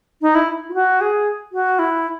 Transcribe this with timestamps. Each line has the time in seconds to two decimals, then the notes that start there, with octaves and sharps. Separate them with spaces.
0.21 D#4
0.34 E4
0.69 F4
0.73 F#4
1.00 G#4
1.52 F#4
1.78 E4